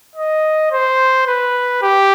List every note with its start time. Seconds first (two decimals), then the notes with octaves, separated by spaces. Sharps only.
0.16 D#5
0.72 C5
1.27 B4
1.83 G4